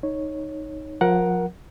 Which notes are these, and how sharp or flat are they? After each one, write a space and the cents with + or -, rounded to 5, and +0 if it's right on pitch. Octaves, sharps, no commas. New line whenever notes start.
D#4 +0 C#5 -5
F3 +35 A#4 +20 F#5 +0